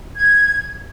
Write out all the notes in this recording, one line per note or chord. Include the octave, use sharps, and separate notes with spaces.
G#6